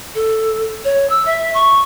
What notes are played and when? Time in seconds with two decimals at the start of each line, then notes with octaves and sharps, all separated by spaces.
0.15 A4
0.85 C#5
1.10 E6
1.26 E5
1.54 C#6